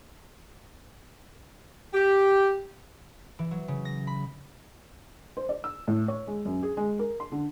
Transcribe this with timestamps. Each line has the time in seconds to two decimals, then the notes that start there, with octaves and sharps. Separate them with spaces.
1.93 G4
3.39 E3
3.51 F#3
3.68 C#3
3.85 A#6
4.07 B5
5.37 C5
5.49 D5
5.64 E6
5.88 A2
6.08 C#5
6.27 G#3
6.45 F#2
6.63 G#4
6.77 G#3
6.99 A#4
7.20 C6
7.32 D3